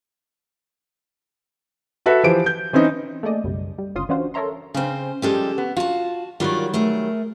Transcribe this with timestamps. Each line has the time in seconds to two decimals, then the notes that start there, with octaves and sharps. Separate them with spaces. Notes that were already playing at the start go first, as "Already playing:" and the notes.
2.06 F#4 A4 B4 E5
2.24 E3 F3 G4 C5 D7
2.46 G6
2.73 E3 C4 C#4 D#4
3.23 A3 A#3 G#4 D5 D#5
3.44 B1 F#2 C#3 G3
3.78 G3
3.95 G1 D2 C#3 F4 C6 D#6
4.09 E3 C#4 D4 F4 F#4 C5
4.34 A4 A#4 C#5 E5 A#5 C6
4.74 C#3 C4 C#4 C5
5.22 F3 G3 G#3 C#4 G4 A4
5.58 B3
5.77 F4 F#4 A5
6.40 D#3 F#3 G3 F4 A#4 D5
6.74 A3 G#4 A#4